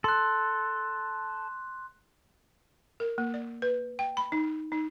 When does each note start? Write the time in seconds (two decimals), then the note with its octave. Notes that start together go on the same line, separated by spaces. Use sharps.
0.04 A4 C6 F#6
3.00 A#4
3.18 A#3
3.34 D5
3.62 B4
3.99 G5
4.17 B5
4.32 D#4
4.72 D#4